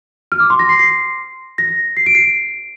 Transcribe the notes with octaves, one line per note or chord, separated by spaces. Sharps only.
F6
D6
C6
A#6
C7
C7
A#6
C7
D7
C7